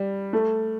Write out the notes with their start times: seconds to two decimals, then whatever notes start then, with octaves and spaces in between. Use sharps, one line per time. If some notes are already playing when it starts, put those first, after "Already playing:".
Already playing: G3
0.33 A3